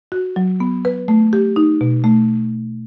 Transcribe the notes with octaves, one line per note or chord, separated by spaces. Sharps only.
F#4
F#3
B3
B4
A3
G4
D#4
B2
A3